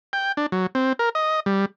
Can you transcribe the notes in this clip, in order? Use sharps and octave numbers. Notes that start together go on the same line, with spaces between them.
G5
D4
F#3
C4
A#4
D#5
G3